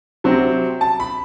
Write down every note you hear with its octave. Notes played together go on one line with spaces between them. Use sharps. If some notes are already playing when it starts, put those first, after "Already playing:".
C3 F#3 C4
A5
B5